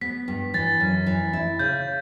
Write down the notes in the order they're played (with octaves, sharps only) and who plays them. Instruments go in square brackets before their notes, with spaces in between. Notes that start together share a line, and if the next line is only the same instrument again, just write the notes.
[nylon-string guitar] B3 [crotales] B6
[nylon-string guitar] G2
[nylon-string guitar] E3 [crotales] A6
[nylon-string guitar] F#2
E3
E4
[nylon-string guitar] C#3 [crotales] G6